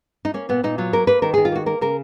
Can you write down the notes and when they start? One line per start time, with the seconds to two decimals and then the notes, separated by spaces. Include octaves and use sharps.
0.25 D#4
0.34 A#3 C#4
0.49 A#2 B3
0.63 A#2 D#4
0.78 F#3 F4
0.93 A#3 A#4
1.07 A#3 B4
1.22 D#3 A#4
1.34 D#3 G#4
1.45 F4
1.52 A#3 F#4
1.66 A#3 A#4
1.81 C#3 A#4